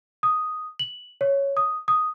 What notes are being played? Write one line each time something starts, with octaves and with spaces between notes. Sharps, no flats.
D#6
F#7
C#5
D#6
D#6